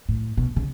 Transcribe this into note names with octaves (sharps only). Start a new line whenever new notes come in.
A2
B2
C#3